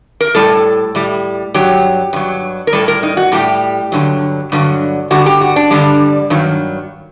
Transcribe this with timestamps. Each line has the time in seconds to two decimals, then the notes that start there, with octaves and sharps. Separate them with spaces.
0.21 A#4
0.35 A2 G3 A4
0.95 A2 G3
1.54 G2 F#3 G4
2.13 G2 F#3
2.67 A#4
2.73 A2 G3 A4
2.88 A#4
3.03 D#4
3.17 F#4
3.32 A2 G3 G4
3.92 G2 D3 F#3
4.52 G2 D3 F#3
5.11 G2 D3 G3 F#4
5.26 G4
5.41 F#4
5.56 D4
5.71 G2 D3 G3
6.30 G2 D#3 F#3